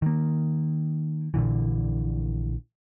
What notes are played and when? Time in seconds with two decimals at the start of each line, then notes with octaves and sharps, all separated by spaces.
0.02 D#3 A#3
1.34 A#1 A#2 D3 E3